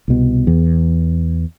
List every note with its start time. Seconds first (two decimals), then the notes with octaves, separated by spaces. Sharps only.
0.08 C2 B2
0.47 E2